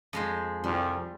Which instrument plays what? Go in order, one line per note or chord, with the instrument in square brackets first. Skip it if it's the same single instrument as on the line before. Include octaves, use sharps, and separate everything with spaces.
[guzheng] F2 G#3 C5
[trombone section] C2 F2 [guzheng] G3